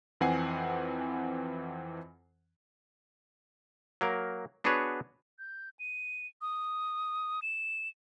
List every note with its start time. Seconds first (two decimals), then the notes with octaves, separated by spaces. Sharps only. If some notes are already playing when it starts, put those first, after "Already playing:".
0.21 F2 E3 C4 F#5 G#5 C7
4.01 F#3 A#3 A#4
4.64 B3 D4 F#4 G#4 B4 C#5
5.39 G6
5.79 D#7
6.42 D#6
7.42 E7